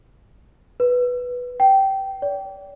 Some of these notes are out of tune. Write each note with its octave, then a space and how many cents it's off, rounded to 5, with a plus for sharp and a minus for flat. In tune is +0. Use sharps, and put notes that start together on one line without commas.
B4 -5
G5 -15
D5 -35